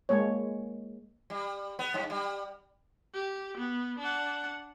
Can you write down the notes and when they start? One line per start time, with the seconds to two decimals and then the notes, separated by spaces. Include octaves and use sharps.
0.09 G#3 A#3 C#5
1.30 G3
1.79 B3
1.94 F#2
2.10 G3
3.14 G4
3.57 B3
3.98 D4 F#5